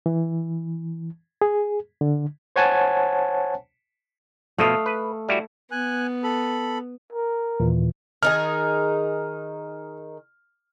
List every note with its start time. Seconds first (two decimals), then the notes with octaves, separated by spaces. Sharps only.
0.06 E3
1.42 G#4
2.01 D3
2.56 C5 C#5 F#5 G#5 A5
4.58 B2 F3 A3 D#5 F5
4.86 B4
5.29 G3 E4 F#4
5.71 B3 G#5 F#6
6.23 A4 B5
7.12 A#4
7.60 D#2 A#2 E3
8.23 D#3 D#4 G#4 F6